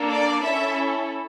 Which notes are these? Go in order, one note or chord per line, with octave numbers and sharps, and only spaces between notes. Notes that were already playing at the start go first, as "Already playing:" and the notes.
Already playing: A#3 D4 A4
D5
C#4 E4 A4 E5